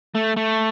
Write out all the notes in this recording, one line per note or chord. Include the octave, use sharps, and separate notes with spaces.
A3
A3